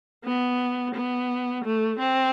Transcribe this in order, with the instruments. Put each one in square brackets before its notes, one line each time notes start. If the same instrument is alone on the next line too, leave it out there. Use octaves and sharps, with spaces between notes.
[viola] B3
B3
A3
C4